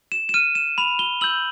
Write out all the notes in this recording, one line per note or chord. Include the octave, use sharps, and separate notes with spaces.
E7
E7
F6 D#7
E7
B5 F7
G7
E6 G6 F#7